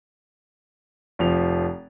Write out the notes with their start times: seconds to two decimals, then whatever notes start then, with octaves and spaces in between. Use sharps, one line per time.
1.19 F1 F3 F7